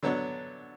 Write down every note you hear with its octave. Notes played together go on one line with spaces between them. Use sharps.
D3 F#3 B3 D4